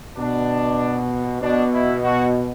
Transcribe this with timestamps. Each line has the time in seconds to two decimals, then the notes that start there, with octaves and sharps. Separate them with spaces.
0.17 B2 D4
1.41 B2 D4
1.72 E4
2.03 F#4